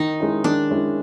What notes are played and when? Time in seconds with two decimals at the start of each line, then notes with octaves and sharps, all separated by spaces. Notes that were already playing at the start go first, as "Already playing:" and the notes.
Already playing: D#3 D#4
0.20 G#3 C#4 E4
0.44 D#3 D4
0.71 G#3 C#4 E4